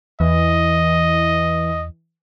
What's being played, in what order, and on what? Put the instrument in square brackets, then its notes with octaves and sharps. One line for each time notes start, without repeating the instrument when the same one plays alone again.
[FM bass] E2 [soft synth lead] E3 [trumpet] D#5